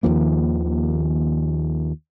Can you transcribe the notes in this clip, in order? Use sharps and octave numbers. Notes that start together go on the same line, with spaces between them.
D#2 D#3 F3 A#3